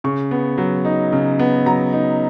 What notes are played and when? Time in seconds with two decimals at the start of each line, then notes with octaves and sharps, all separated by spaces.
0.04 C#3 C#6
0.31 B3
0.58 F#3
0.85 D#4
1.13 C#3
1.39 B3
1.66 F#3 A#5
1.93 D#4